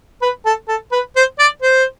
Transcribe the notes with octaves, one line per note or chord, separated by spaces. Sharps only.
B4
A4
A4
B4
C5
D5
C5